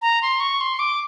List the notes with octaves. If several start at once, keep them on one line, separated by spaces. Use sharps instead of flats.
A#5
C6
C#6
C6
D6